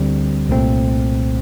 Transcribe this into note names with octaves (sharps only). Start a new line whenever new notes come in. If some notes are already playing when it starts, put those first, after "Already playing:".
Already playing: D2 D3 G3 C4
C2 A#2 A3 C4